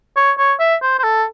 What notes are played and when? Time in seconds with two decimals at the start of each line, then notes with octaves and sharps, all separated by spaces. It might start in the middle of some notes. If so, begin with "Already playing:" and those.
0.16 C#5
0.38 C#5
0.60 E5
0.82 C5
0.99 C5
1.03 A4